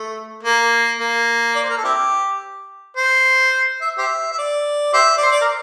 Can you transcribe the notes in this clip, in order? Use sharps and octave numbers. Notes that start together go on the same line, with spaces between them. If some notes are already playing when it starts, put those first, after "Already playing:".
Already playing: A3
A#3
A#3
D5
C5
A#4
A4
C4 E4 G4
C5
E5
G4 C5 E5
E5
D5
G4 C5 E5
D5
C5
D5
A#4